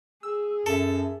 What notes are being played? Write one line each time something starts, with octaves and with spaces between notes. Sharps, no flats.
G#4 E6
F#2 A4 E5 A5